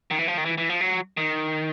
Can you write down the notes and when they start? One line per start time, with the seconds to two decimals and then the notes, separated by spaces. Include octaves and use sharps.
0.11 D#3
0.19 E3
0.28 F3
0.38 D#3
0.46 E3
0.58 E3
0.69 F3
0.81 F#3
1.17 D#3